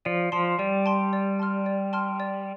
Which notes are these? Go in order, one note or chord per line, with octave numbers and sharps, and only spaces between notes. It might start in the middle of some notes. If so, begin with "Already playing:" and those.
F3 D5
F3 A5 C6
G3 D5
A5 C6
D5
A5 C6 F6
D5
A5 C6 F6
D5